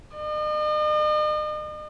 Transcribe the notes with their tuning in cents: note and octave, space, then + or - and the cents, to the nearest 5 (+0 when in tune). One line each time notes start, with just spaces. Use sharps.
D#5 -45